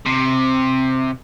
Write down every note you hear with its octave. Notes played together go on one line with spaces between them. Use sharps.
C3